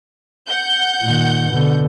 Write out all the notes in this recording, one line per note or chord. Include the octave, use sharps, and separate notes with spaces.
F#5 G6
A#2 D#3
B2 D3